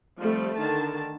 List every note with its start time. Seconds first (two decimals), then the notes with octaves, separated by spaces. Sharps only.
0.19 F3 G3 A3 C4
0.57 D3 D#3 A5